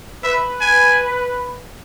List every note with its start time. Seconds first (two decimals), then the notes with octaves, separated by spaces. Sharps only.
0.24 B4 E5
0.61 G#5